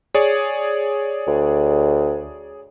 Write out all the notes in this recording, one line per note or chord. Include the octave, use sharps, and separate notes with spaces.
G#4 C#5 D5
D2